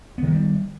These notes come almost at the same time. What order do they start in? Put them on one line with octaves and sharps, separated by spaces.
B3 D#3 G#3 G3